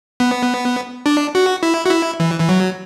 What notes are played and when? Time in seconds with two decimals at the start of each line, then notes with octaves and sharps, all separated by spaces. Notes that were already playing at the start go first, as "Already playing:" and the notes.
0.20 B3
1.06 D4
1.35 F#4
1.63 E4
1.86 F#4
1.91 E4
2.20 E3
2.40 E3
2.49 F#3